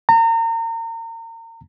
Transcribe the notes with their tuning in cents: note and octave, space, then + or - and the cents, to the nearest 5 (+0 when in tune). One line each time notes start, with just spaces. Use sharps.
A#5 -35